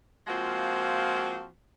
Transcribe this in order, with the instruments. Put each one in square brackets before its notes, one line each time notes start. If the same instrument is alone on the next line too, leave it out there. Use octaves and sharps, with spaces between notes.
[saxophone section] F3 G#3 A#3 C4 F4 F#4